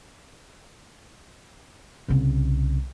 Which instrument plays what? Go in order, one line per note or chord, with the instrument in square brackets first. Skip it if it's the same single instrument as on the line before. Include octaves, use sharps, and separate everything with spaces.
[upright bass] C2 C#3